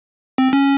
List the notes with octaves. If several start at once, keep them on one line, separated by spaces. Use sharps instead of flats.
C4
C#4